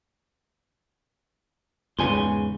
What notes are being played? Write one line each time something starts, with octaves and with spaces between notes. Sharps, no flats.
E2 G#2 C#3 G#5 C6